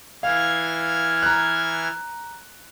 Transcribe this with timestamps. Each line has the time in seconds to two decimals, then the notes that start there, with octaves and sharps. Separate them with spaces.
0.23 E3 F5 F6 G#6
1.22 A#5 F#6